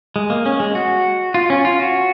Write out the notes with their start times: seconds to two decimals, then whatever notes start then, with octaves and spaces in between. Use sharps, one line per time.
0.16 G#3
0.30 A#3
0.46 C#4
0.60 G#3
0.75 F#4
1.34 F4
1.50 C#4
1.65 F4
1.80 F#4